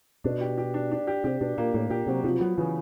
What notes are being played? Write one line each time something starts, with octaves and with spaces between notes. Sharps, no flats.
B2 D4
G4
G4
D4
D4
G4
C3 G4
B2 D4
A#2 A#3
A2 A#3
A#2 G4
C3 F#3
C3 F3
F#3 B3
C#3 E3